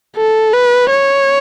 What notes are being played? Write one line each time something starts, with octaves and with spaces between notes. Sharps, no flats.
A4
B4
C#5